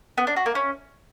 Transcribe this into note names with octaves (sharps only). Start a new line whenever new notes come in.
B3
D4
F#4
A#3
C#4